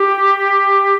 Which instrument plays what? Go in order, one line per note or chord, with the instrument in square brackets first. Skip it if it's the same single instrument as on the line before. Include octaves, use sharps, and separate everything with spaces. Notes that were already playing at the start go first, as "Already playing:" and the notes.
Already playing: [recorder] G4